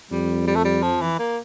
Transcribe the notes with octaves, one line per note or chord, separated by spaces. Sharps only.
F2 G3
G3
A3
G3
F3
E3
A#3